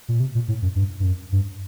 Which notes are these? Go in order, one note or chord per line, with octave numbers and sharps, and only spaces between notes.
A#2
C3
A#2
A2
F#2
G2
G2
F#2
G2